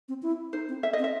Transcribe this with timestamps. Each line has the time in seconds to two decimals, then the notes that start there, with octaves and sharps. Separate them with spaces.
0.09 C4
0.22 E4
0.53 D#4 C5
0.69 C4
0.83 E5
0.93 D#5
0.99 C4
1.04 E5